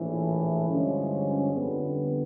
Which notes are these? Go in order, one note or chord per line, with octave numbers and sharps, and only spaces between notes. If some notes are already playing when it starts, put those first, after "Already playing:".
Already playing: A#1 A2 E3
G2 D3 F3 G#3 C#4
F2 D3 G3 B3